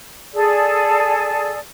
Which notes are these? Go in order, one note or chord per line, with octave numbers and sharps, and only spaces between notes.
G#4 A4 D5